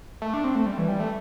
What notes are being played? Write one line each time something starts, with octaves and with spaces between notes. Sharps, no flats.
A3
D4
C4
A3
G3
E3
G3
A3